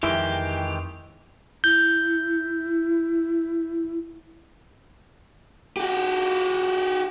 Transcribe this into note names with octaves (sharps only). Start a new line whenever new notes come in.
F2 D#3 E3 G#3 E4 G4
E4 G6
F#4 G4